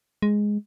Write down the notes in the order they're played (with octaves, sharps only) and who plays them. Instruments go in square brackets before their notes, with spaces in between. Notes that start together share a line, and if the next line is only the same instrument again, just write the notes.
[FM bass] G#3